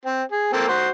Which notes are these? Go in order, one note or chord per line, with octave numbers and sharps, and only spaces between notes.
C4
G#4
A#3 C4 A4
F#4 C5